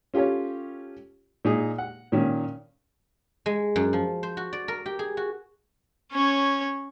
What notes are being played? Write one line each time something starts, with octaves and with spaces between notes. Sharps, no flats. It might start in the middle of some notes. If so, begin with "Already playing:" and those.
C#4 F4 G4 A4 C#5
A#2 D#4 G#4
F#5
A#2 D#3 C#4
G#3
F#2
F3
C5
F#4
D5
A#4
G4
G#4
F#4
C#4 C#5